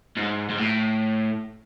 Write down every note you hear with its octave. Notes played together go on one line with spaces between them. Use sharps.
G#2
G#2
A2